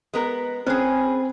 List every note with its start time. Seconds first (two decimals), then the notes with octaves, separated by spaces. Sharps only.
0.14 G#3 B3 A#4
0.67 C4 C#4 G#4 B4